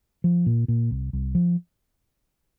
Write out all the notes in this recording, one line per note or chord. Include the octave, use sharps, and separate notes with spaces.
F3
A#2
A#2
C2
C2
F3